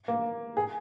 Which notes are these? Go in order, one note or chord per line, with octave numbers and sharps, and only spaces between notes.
A#3
G#4